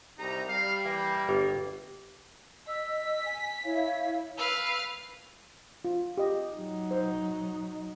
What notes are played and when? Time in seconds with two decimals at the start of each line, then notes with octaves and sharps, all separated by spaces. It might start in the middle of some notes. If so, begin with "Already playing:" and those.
0.18 C2 D#4 G4 A#5
0.49 G3 F5
0.85 E3 A#3
1.29 G1 G4
2.68 D#5 E6 B6
3.24 G#5
3.64 E4 C#5 F5
4.38 B4 F5 E6
5.85 F4
6.18 G4 D#5
6.54 F#3 D#4
6.91 C5